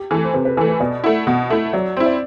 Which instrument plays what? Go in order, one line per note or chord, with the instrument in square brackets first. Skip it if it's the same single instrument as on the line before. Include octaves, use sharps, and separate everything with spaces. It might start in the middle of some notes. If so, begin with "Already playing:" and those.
Already playing: [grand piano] G4
[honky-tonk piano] E3 A3 [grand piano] A4
[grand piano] C5
[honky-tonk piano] C3 [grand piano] B4
[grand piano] B4
[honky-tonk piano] E3 A3 [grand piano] B4
[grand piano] B4
[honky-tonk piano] B2 [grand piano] D5
[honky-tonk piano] A3 E4 [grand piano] F#5
[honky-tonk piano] B2 [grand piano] F#5
[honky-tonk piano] A3 E4 [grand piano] E5
[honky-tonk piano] F#3 [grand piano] D5
[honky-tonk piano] C4 E4 [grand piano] C5
[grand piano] D5